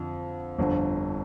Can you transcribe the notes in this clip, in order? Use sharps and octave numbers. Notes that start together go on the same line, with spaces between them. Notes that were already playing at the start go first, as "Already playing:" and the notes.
Already playing: F2 D3
G1 F2 D3